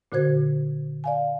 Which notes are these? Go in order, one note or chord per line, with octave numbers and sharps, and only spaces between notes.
A#2 D3 F#4 C5 G#6
D5 F5 G#5